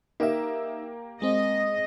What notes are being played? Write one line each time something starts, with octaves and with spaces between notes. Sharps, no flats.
A#3 D#4 G4 A#4 E5
G#3 C4 D#5